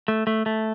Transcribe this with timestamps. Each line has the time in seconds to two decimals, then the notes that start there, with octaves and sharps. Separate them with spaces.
0.08 A3
0.27 A3
0.46 A3